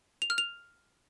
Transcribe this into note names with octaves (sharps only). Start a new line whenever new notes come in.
F7
F6
F7